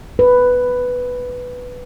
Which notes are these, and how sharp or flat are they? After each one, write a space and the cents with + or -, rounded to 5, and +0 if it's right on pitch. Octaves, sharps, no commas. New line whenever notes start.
B4 +5